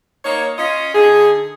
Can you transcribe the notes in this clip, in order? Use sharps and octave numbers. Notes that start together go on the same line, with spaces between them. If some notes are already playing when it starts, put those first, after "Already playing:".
A#3 D#4 C#5
C#4 F4 D#5
D3 D#4 G#4